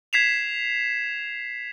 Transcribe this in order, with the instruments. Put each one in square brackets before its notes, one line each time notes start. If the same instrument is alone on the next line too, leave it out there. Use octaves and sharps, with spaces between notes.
[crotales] G#6 B6 C7 E7 F7